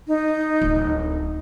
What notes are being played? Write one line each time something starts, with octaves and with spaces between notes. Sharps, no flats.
D#4
D1